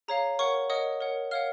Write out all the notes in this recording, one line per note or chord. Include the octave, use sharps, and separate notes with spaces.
G#4 C#5 F5 A#5
A#4 C#5 F#5 C#6
A#4 C#5 D#5 F#5 D#6
A#4 C#5 F#5
A#4 C#5 F5 F#5 F6